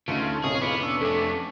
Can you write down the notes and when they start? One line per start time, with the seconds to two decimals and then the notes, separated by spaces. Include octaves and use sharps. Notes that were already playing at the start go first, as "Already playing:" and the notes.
0.08 D2 C#3 A3 D#4 F4
0.43 C2 A2 G#4 C#5 D#5 F5
0.61 F1 B3 C#4 F4 B4 D6 D7
0.83 C#4 D4 E6
1.01 F2 A3 A4